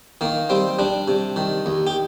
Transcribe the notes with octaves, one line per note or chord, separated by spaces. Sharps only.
D#3 A#3
G3 C4
G3 D4
C3
D#3
D#2
G4